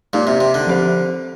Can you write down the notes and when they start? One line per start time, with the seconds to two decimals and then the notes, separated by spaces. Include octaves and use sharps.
0.13 A#2 G#3 D#4 G4 D5
0.27 C3
0.40 C3
0.54 D3
0.67 F3 C4 G4 C5